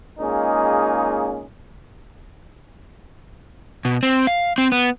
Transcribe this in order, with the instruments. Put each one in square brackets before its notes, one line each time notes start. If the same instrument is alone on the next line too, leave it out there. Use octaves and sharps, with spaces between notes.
[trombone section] G#3 A#3 C#4 D#4 F4 G#4
[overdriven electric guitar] B2
C4
F5
C4
B3